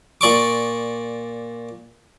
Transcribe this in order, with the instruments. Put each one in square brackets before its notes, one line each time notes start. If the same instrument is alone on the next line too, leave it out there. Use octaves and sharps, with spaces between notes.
[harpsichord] A#2 D5 C#6 D6